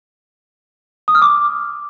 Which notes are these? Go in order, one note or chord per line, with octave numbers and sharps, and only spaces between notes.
D#6
F6
D6